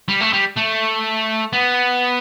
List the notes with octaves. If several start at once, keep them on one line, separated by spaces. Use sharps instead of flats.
G3
A3
G3
A3
B3